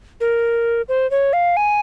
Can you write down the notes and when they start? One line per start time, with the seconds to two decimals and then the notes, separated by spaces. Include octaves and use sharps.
0.21 A#4
0.89 C5
1.11 C#5
1.33 F5
1.57 G#5